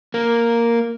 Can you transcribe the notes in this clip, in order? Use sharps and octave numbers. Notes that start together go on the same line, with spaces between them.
A#3